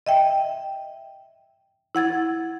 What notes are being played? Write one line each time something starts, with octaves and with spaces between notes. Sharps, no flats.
D#5 E5 G5
E4 F#5 G#6 A6